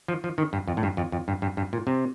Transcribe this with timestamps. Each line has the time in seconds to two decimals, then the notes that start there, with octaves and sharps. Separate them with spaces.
0.08 F3
0.24 F3
0.38 D#3
0.53 G2
0.68 F2
0.77 A2
0.83 G2
0.97 F2
1.12 F2
1.28 G2
1.42 G2
1.57 G2
1.73 A#2
1.87 C3